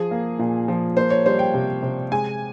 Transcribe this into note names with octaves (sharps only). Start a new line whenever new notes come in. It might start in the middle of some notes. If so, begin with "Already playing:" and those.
Already playing: F3 G#4
A#3
A#2
F3
A#3 C5
C#5
G3 C5
G5
C3
C3
G#3 G#5